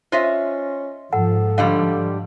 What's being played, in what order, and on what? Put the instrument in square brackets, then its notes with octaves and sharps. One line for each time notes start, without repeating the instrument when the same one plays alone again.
[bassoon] C#4 [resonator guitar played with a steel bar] F4 D#5 E5 [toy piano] C5
[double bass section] G#2 F3 [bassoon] A4 [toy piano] F#5
[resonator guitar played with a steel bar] G2 D3 G3 [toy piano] D#5 F5